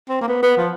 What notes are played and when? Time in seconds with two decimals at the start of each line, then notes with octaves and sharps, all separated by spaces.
0.09 C4
0.21 A#3
0.28 B3
0.43 B3
0.57 F3